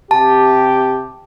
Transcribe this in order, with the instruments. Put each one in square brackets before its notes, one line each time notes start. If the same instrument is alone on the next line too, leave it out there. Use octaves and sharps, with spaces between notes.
[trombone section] C3 G4 [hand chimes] A5